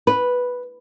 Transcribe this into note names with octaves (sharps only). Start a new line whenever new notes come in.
B4